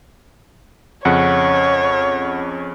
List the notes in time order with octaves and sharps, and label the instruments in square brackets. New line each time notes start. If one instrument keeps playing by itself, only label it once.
[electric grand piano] F2 C#3 C#4 [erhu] C#5 [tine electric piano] F#5